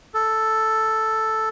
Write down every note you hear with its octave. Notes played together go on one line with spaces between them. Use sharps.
A4